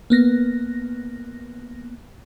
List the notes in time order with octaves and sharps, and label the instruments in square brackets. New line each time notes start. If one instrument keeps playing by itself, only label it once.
[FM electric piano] A#3 B3 A#6